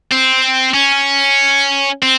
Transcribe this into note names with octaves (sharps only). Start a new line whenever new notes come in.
C4
C#4
C4